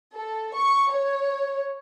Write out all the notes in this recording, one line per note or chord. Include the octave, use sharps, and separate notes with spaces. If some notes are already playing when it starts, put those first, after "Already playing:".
A4
C#6
C#5